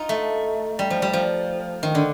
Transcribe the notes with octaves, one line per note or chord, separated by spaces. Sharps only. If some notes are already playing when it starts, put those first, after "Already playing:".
Already playing: D#4 F4
A3
G3
F3
G3
F3
D#3
D3